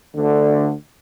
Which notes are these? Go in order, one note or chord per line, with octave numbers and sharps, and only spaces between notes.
D2 D3